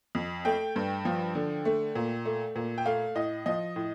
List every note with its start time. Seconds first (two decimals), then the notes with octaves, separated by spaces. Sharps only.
0.15 F2
0.45 A3 G5
0.76 G2
1.05 F3
1.35 D3
1.65 A3
1.95 A#2
2.25 A3
2.56 A#2
2.78 G5
2.86 A3 F5
3.15 A2 D#5
3.46 F3 D#5
3.76 A2